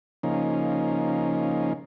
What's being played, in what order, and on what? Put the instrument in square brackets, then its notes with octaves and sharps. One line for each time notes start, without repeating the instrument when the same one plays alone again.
[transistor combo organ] C#3 F3 A#3 C#4 D#4